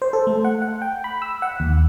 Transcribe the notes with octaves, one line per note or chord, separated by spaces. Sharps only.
C5
A4
A3
F#5
F#5
G5
B5
E6
F#5
D#2